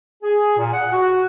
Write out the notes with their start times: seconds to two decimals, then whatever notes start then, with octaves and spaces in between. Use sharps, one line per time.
0.23 G#4
0.57 A#2
0.73 F#5
0.92 F#4